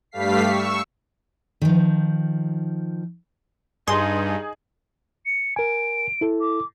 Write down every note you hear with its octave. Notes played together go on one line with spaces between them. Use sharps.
G2 G3 A3 F5 B6 C7
C#6 E6
D#3 F3
G2 D#4 G#4 C6
C#7
A#4 G#5 D7
E4 A4
D6